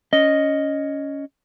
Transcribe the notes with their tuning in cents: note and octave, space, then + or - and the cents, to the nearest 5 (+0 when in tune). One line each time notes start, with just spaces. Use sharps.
C#4 +15 D#5 +0